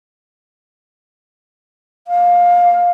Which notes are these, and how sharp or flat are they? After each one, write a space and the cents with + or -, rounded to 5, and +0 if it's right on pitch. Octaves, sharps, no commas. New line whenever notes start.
F5 +15